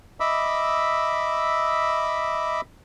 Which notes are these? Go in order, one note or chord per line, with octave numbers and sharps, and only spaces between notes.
D#5 E5 B5 D6 E6